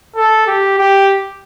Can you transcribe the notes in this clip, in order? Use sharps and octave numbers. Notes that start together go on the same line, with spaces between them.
A4
G4
G4